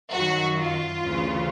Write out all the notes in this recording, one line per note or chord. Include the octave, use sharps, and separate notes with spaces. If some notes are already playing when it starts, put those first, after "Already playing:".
F#2 D#3 F#3 F#4
F4
D2 C#3 E3